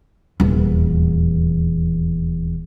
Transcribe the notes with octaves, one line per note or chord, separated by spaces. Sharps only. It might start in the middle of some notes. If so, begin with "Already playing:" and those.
D#1 E2